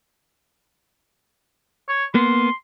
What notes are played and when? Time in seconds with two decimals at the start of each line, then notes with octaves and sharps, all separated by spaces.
1.89 C#5
2.15 A#3 B3 C6